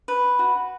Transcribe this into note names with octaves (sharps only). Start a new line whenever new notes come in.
B4
F#4